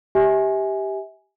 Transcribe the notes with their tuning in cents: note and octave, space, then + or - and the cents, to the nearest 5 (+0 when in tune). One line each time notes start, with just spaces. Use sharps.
G4 +0 E5 -30 G#5 +0